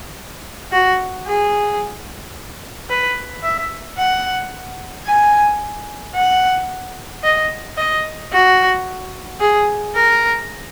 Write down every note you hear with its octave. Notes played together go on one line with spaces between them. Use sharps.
F#4
G#4
B4
E5
F#5
G#5
F#5
D#5
D#5
F#4
G#4
A#4